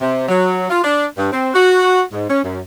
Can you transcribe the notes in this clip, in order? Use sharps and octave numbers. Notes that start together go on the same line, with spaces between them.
C3
F#3
F4
D4
G2
C4
F#4
G#2
C#4
F#2